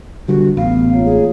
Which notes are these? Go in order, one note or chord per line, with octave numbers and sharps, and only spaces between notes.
D3 G3 F#4
A1 B3 F5
A#3 F4 C#5
G#4